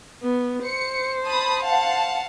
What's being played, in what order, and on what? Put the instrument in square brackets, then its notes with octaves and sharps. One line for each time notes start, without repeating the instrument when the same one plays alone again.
[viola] B3
[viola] C5 [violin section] C#7
[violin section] A5 B5 D#6
F5 F#5 A5